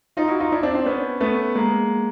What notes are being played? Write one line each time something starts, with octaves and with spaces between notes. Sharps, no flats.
D#4 F4
E4 F#4
D#4 F4
D4 E4
C4 D4
C4 D4
B3 C#4
A3 B3
G#3 A#3